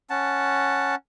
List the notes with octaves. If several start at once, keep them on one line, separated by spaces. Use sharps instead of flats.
C#4 F#5 A5